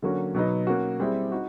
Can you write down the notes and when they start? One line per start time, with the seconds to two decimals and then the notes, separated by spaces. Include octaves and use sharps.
0.02 D3 F#3 A#3 C#4 F#4
0.35 B2 F#3 B3 D#4
0.67 A#3 C#4 F#4
1.00 G3 C4 E4 G#4
1.32 D#4 F#4